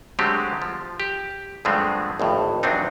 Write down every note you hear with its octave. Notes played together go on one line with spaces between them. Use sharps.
D3 F#3 G#3 A3 C4 G4
F3
G4
G2 D3 F3 G#3 A3 C4
G#1 F2 A2
E2 C3 F#3 C4 D4 D#4